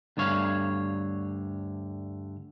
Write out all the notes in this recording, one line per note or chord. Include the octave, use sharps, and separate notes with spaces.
D2 G2 D3 C#5 F5